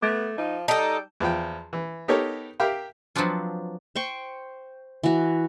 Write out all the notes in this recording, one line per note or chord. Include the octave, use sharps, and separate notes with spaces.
A3 B3 D6 G#6 A6
F3 D#4
G3 D#4 A4 G5 A5
E2 F3 F4 G5
E3
B3 D#4 G4 A4 A#4 C#5
G4 A#4 E5 F5 G5
F3 F#3 B3 C4 D4 F4
C5 G5 C#6
E3 F#4